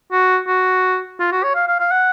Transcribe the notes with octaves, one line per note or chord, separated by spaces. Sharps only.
F#4
F#4
F4
F#4
C#5
F5
F5
F5
F#5